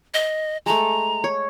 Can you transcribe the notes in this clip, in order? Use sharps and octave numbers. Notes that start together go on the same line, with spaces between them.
D#5
G#3 A3 A#5
C#5